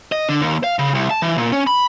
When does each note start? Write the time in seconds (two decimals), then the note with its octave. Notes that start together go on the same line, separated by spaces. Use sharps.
0.12 D#5
0.29 D3
0.42 D#2
0.64 F5
0.79 C#3
0.95 C2
1.11 A5
1.22 E3
1.38 A#2
1.52 C#4
1.67 B5